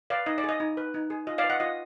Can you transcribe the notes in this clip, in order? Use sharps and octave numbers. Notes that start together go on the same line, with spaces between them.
B4 D5 F5
D#4 D#5
D5
G#4
D#5
D#4
B4
D#4
G#4
F4 D#5
D5 F5
B4
D#5 F#5
F4 D#5